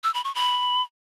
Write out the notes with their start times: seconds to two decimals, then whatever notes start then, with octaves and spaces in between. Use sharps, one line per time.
0.04 E6
0.14 B5
0.25 C#6
0.35 B5